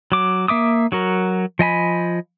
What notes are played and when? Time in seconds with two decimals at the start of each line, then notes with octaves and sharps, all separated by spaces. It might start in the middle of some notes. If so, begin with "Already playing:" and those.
0.12 F#3 D6
0.48 A#3 E5 D6 D#6
0.92 F#3 F#4 A#4
1.59 F3 D#5 G#5 B5